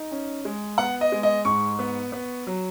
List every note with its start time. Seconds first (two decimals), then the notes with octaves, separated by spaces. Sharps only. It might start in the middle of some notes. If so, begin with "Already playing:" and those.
Already playing: D#4
0.11 C#4
0.45 G#3
0.78 B3 F#5
1.01 D#5
1.12 G#3
1.23 D#5
1.45 G#2 C#6
1.79 B3
2.12 B3
2.47 F#3